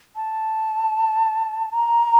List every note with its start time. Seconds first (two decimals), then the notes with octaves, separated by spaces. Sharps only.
0.16 A5
1.71 A#5